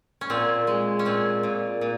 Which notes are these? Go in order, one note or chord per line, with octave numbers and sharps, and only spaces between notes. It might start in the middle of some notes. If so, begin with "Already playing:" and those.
C#4
A#2 C4
G#3
C#4
A#2 C4
A#2
A#2